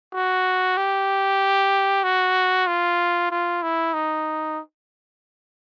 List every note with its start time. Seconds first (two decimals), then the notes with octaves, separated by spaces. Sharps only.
0.14 F#4
0.77 G4
2.04 F#4
2.67 F4
3.31 F4
3.63 E4
3.94 D#4